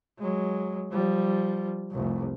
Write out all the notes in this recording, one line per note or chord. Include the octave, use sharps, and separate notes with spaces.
F#3 G#3
F3 G3
F1 C2